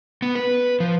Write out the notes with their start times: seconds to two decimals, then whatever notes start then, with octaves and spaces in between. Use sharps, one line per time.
0.22 B3
0.35 B4
0.80 F3